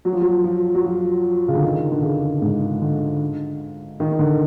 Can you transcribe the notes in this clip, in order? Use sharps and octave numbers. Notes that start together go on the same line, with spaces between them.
F#3
F3
F#3
F3
F#3
F3
C#3
D3
D#3
D3
C#3
G#2
D3
D#3
D#3
D3